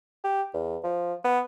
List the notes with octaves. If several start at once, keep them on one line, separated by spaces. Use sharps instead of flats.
G4
E2
F3
B3